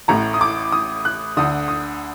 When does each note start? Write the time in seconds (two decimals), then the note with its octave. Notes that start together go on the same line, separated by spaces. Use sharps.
0.08 A1 A2 A#5
0.34 D#6
0.41 D6
0.72 D#6
1.05 F#6
1.37 D2 D3 D#6
1.68 D#6